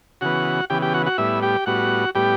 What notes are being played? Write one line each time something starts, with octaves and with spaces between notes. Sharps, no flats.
C#3 E3 B3 F#4 F#5
C#3 E3 B3 G4 G5
G4 G5
F#4 F#5
F#4 F#5
A2 G3 B3 E4 E5
G4 G5
A2 G3 B3 F#4 F#5
A2 G3 B3 G4 G5